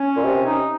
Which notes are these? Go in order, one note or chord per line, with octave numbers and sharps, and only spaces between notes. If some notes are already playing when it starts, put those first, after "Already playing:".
Already playing: C#4
A#2
C3
D#4